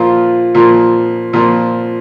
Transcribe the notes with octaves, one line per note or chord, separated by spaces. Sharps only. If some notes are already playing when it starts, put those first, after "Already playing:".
Already playing: A#2 F3 F4
A#2 F3
A#2 F3